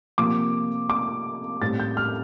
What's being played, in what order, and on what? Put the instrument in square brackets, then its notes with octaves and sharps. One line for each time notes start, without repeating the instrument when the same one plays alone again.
[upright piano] C3 F3 A#3 D6
D6
A2 G3 C4 A6
G6
F6